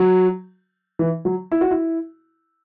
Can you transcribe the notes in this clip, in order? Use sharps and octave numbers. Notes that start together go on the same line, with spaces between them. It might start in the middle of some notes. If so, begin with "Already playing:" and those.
Already playing: F#3
E3
F#3
E4
F#4
E4